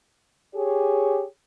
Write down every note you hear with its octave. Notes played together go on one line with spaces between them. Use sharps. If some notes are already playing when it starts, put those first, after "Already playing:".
G4 G#4 C#5